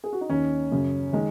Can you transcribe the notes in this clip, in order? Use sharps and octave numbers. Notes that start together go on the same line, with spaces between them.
G#4
F#4
D#4
D#2 D#3 C#4
F#2 C#3
D#3 G#3